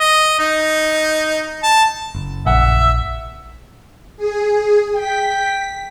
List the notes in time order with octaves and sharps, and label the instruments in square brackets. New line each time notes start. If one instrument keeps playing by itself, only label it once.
[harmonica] D#5
D#4
A5
[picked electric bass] F#1
[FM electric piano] A#1 [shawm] E5 [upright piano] F#5
[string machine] G#4
[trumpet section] G5 [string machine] B6